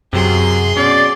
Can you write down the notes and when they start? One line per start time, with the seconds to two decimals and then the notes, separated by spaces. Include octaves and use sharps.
0.13 F#2 C3 F#3 G#4 C6
0.76 B2 C#4 D5 C7